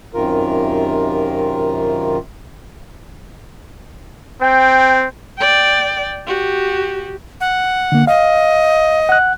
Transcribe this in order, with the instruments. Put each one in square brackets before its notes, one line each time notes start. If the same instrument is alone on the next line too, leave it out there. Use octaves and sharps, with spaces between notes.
[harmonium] F#2 C3 D#3 F4 A#4
[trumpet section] C4 G5
[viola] D5 G5
F#4 G4
[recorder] F#5
[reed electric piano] D3 A#3
[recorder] D#5 [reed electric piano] F5
[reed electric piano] F#5 F#6